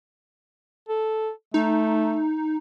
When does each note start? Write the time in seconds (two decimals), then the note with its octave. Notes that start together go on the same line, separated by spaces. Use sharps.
0.89 A4
1.54 A3 D#4